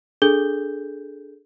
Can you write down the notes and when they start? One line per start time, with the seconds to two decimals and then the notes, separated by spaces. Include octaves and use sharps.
0.22 D4 G#4 A4 G6 G7